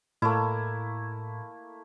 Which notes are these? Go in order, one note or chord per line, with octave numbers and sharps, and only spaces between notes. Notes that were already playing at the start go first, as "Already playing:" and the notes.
A2 A3 A#3 E4